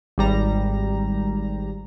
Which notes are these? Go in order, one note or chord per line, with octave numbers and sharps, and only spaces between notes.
G#1 G3 A#5